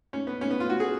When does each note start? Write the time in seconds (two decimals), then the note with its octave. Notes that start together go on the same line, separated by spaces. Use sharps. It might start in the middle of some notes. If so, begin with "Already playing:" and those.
0.13 C#4
0.27 B3
0.41 C#4
0.50 B3
0.60 F4
0.70 F#4
0.80 G#4